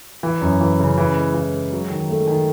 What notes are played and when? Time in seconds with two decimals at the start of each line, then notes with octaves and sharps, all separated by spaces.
0.23 E3
0.41 F#2
0.61 E3
0.79 C#3
0.98 E3
1.16 G#3
1.34 E3
1.53 G#3
1.73 F#3
1.90 D#3
2.10 A3
2.27 D#3